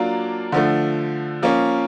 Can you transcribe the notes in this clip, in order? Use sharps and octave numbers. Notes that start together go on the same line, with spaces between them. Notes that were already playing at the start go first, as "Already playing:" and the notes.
Already playing: F#3 A#3 D4 F4
D3 F3 A3
F3 A#3 C#4